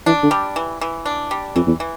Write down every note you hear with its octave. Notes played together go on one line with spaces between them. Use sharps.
E3 D4
D3
G3
E3
E3
D4
G3
F2 E3
E2
E3